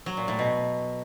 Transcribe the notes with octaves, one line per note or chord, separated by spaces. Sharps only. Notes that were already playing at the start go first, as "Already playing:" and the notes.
F#3
A#2
A2
B2